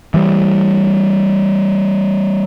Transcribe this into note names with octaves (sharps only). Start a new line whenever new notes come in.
E3 G3